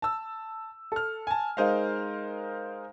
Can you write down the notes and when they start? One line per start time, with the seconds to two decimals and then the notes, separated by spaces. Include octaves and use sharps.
0.02 A5 E6
0.92 A4 F6
1.27 G#5 A5
1.57 G#3 D#4 A#4 C5 D#5 F5